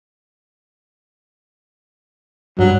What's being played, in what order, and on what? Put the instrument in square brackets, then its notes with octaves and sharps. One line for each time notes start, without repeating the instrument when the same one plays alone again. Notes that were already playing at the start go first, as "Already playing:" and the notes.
[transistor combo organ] G2 [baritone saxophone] F#3